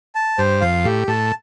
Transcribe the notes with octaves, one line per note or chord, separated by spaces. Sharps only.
A5
G2 C5
F2 F5
A2 G4
A2 A5